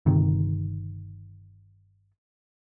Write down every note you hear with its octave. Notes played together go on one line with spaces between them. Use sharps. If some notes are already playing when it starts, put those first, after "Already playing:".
G1 C3 D#3